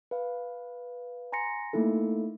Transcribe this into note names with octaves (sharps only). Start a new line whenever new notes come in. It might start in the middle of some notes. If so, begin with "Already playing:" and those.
B4 F5
G#5 A#5 C6 A#6 C#7
A3 A#3 D#4 E4 A4